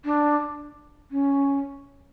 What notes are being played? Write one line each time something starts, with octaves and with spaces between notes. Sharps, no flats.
D4
C#4